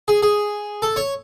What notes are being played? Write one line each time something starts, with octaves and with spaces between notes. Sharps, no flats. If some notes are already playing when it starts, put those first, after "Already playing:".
G#4
G#4
A4
C#5